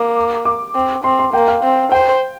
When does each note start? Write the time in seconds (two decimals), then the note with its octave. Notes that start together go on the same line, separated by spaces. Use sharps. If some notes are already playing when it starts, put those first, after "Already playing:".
Already playing: A#3 D6
0.45 D6
0.75 C4
1.04 C4 C6
1.19 C6
1.33 A#3 G5
1.48 F5
1.63 C4
1.92 C5 G5